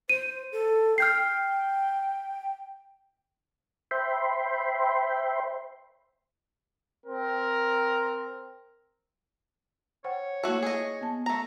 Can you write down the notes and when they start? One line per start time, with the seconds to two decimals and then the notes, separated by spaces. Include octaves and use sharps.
0.09 C5 D#7
0.52 A4
0.98 G5 F6 G6 C7
3.91 C5 E5 G5 B5 C6
7.06 C4 A#4
10.04 C5 C#5 F#5 G5
10.44 A3 A#3 E4 F#4 F5
10.62 G#4 D#5
11.01 B3 A5
11.26 A3 A#5